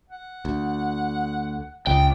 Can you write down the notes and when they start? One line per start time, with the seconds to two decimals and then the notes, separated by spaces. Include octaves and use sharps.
0.10 F#5
0.45 D2
1.87 C#2 G5